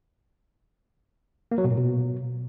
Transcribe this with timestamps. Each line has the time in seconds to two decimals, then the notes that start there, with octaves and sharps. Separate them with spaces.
1.51 A#3
1.58 F#3
1.64 B2
1.71 A#2
1.77 B2